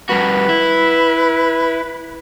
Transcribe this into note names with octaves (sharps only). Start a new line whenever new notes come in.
G2 F#4 B4
E4